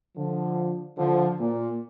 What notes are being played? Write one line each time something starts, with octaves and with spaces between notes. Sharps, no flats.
D3 F3
D3 F3
A#2